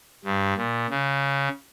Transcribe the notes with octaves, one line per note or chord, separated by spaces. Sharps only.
G2
A#2
C#3